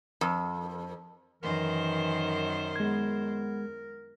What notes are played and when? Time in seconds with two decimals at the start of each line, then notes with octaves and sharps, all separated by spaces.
0.21 F2
1.43 F#2 D#3 E3 A#4 C5
2.76 G#3 B3 G#6